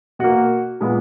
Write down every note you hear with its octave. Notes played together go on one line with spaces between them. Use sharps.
B2 A#3 F#4
A#2 G#3 B3